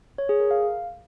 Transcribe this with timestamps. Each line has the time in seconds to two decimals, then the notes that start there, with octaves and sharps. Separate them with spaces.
0.18 C#5
0.29 G#4
0.40 A#4
0.51 F5